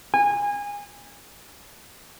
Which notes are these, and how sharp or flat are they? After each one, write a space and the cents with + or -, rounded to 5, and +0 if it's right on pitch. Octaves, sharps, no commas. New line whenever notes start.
G#5 -25